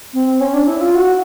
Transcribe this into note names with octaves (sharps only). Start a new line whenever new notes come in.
C4
C#4
D4
E4
F4
F#4